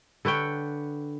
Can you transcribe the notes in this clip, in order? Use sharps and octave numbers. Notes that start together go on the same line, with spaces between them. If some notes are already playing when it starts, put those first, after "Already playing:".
D3 B4 C#5 G5